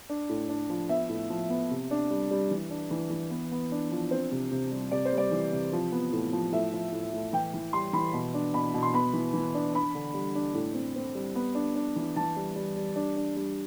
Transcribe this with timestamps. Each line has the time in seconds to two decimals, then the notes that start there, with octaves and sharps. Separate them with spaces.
0.09 D4
0.29 A2
0.49 D4
0.70 F3
0.89 B3 E5
1.09 A2
1.30 F3
1.50 B3
1.70 C3
1.91 D4
2.10 G3
2.31 G3
2.51 E3
2.70 D4
2.91 E3
3.10 E3
3.30 B3
3.52 B3
3.72 D4
3.92 F3
4.11 C4 C5
4.32 C3
4.51 C3
4.71 G3
4.91 C3 D5
5.05 C5
5.13 G3
5.18 D5
5.31 E3
5.52 C3
5.73 F3
5.92 B3
6.12 A2
6.33 F3
6.52 A2 E5
6.73 F3
6.92 A2
7.13 A2
7.33 E3 G5
7.54 E3
7.73 G3 C6
7.93 E3 B5
8.13 B2
8.34 D4
8.54 B2 B5
8.74 B2
8.83 C6
8.94 B3 B5
9.14 E3
9.34 E3
9.55 D4
9.74 D4 B5
9.95 D3
10.14 G3
10.35 D4
10.54 A2
10.74 C4
10.96 C4
11.15 G3
11.35 B3
11.55 D4
11.76 D4
11.96 E3
12.16 E3 A5
12.36 G3
12.56 G3
12.76 G3
12.96 D4
13.16 D4
13.36 G3